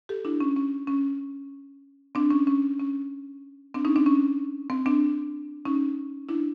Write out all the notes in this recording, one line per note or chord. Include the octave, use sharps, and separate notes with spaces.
G4 A4
D4 E4
C#4
C#4
C#4
C4 D4
C#4
C#4
C#4
C4 D4
C#4 D#4
C4 D4
C#4
C4
C4 D4
C#4 D#4
D4 E4